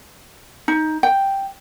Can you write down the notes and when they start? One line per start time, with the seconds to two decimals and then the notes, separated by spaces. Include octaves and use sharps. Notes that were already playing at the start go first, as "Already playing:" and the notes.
0.68 D#4
1.03 G5